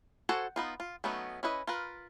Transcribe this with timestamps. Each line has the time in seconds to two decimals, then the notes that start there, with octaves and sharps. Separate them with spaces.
0.29 F#4 A4 C5 F#5 G#5
0.56 B3 D#4 F4
0.80 F4
1.04 F#3 A3 B3 C#4 D#4
1.43 C#4 E4 B4 D#5
1.67 F4 A#4 B4